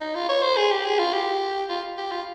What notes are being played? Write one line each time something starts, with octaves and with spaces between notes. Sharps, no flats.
D#4
F4
C#5
C5
G#4
G4
G#4
F4
G4
F4
G4
F4